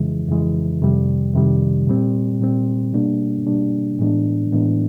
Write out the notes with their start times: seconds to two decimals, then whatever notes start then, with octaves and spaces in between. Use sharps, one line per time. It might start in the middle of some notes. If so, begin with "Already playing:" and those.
Already playing: F2 C#3 E3 G#3
0.29 F2 C#3 E3 G#3
0.82 F2 C3 D#3 G3
1.34 F2 C3 D#3 G3
1.87 A#2 G3 C4
2.40 A#2 G3 C4
2.93 B2 G3 A#3 D4
3.46 B2 G3 A#3 D4
3.99 A2 E3 G#3 B3 D4
4.52 A2 E3 G#3 B3 D4